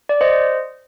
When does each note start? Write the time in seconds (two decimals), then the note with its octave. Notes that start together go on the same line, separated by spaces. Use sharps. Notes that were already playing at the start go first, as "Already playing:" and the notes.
0.09 D5
0.21 C5 D#5